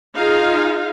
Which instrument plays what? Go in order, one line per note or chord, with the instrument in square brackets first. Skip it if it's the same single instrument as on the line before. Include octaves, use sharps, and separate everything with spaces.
[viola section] D#4 F4 G#4 F5